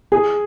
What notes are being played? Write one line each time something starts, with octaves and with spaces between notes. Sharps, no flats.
G#4